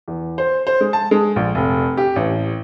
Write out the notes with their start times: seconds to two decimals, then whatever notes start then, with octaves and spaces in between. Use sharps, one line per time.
0.08 E2
0.38 C5
0.67 C5
0.81 G#3
0.93 A5
1.11 G#3
1.36 A#1
1.55 F1
1.97 G4
2.16 A1